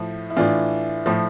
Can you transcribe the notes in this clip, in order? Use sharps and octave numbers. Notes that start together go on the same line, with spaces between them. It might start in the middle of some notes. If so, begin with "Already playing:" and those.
Already playing: A2 F3
E4
A2 E3 D4 F4
A2 F3